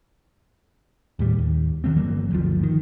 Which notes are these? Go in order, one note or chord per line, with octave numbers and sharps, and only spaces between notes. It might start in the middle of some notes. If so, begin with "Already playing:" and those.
D#2 A2 G3
D#2
F2 D#3 A3 C4
G1 E3 F#3 A#3
G1 D2 F3
D#3